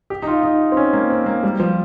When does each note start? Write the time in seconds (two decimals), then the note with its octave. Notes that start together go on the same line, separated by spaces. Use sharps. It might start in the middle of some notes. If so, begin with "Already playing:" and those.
0.10 G4
0.22 D#4
0.27 F4
0.43 D#4
0.72 C4
0.77 C#4
0.93 A#3
1.10 C4
1.26 A#3
1.43 G3
1.60 F3